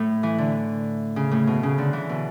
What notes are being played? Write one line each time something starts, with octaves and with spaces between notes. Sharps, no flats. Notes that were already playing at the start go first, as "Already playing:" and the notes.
Already playing: A2
E3
D3
C#3
A2
B2
C#3
D3
E3
B2